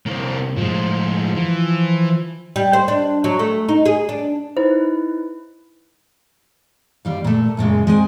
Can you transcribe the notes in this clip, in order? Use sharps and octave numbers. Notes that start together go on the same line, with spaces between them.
C2 A#3 C4
A2 F3 G#3
E3
G3
C5
D4
F#3
A3
D#4
G#4
D4
D#4 E4 B4 C5
D#2 G3 F5
A#2 A3
F#2 A#2 C#3 G#3
G#3 C4 G#5